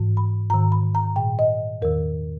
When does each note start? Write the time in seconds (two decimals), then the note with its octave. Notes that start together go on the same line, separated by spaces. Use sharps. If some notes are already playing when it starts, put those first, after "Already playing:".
Already playing: G#2 E3
0.17 B5
0.50 G#2 D#3 A#5
0.72 B5
0.95 A#5
1.16 A#2 G5
1.39 D#5
1.82 E2 D#3 A#4